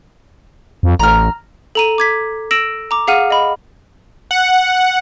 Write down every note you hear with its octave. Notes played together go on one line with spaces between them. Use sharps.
F2
A1 A#5 F6
A4 A#5 D#7
D6 G#6 B6
E6 A#6 D7 E7 F#7
A#5 D6
G#4 F5 F#5 F6 D#7
D#5 B5
F#5